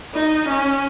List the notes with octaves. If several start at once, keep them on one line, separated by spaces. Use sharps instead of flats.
D#4
C#4